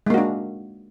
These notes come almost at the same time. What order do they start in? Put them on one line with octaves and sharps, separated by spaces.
G#3 A#3 F#4 D4